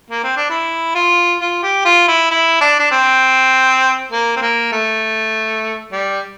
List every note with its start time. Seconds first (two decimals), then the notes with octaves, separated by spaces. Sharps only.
0.11 A#3
0.24 C4
0.37 D4
0.50 E4
0.95 F4
1.41 F4
1.63 G4
1.85 F4
2.08 E4
2.31 E4
2.61 D4
2.80 D4
2.91 C4
4.12 A#3
4.36 C4
4.42 A#3
4.72 A3
5.92 G3